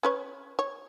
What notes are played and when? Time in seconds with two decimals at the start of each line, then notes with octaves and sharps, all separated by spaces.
0.03 C#4 B4 C#5
0.59 C#5